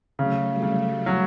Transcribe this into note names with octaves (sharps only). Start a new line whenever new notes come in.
C#3 F#3 A3
G3
C#3
G3
F#3